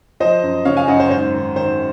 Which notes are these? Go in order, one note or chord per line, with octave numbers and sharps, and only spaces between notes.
F3 C5 D#5
F#2
C#3 C#5 F5
F5 G#5
F#2 D#5 F#5
C5
G#2 C5
D#3
D#3 C5